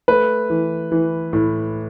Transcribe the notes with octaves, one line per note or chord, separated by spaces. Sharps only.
A3 B4
E3
E3
A2